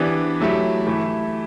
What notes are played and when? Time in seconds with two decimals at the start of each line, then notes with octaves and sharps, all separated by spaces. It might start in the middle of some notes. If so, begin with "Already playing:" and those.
Already playing: E3 B3 D4 G4
0.40 F#3 A3 E4 G4
0.87 E3 A3 E4 G4